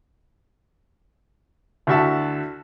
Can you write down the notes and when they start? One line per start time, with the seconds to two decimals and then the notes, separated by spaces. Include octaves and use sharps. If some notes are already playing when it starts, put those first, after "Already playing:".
1.87 D2 E4 F#4 E5 F#5 A5